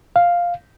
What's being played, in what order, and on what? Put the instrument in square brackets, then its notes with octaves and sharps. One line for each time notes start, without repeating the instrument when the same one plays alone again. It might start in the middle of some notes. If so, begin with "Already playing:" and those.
[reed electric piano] F5